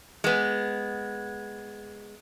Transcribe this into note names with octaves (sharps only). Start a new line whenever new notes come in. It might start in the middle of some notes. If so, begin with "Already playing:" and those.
G#3 B3